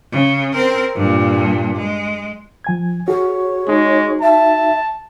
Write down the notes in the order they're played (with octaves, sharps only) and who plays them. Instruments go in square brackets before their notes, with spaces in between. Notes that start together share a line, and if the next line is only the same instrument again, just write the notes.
[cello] C#3
C4 A#4
G2 A#2
G#3
[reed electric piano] F3 G#5 G#6
[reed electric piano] F#4 G#4 [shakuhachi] C#5
[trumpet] G#3 [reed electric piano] D#4 F#4
[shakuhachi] E5 [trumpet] A5